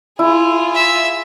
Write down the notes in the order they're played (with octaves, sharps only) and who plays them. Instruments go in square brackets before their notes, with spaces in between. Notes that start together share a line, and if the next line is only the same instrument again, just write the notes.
[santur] E4 [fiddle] F4 G#4
[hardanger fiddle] E5